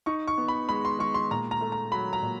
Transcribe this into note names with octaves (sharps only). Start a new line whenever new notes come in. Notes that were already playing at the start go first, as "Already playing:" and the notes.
D#4 C#6
C#6
B3
B5
G#3 B5
C6
G#3 C#6
C6
A#2 A#5
A#5
A3
A#5
F#3 B5
A#5
A#2